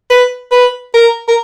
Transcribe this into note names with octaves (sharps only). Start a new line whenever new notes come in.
B4
B4
A#4
A#4